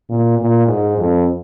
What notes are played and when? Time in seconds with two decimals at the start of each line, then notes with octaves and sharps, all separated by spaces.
0.09 A#2
0.39 A#2
0.68 G#2
0.98 F2